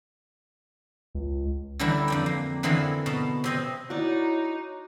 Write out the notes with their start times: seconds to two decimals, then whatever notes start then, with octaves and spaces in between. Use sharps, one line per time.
1.15 C#2
1.79 D3 E3 G3 D4 E4 A#4
2.08 F2 D4 G5
2.26 A#3
2.63 D3 E3 C4 G#4 A#4 F5
3.06 B2 A5
3.44 C3 C4 D#5
3.90 D#4 E4 F#4 C#5 D5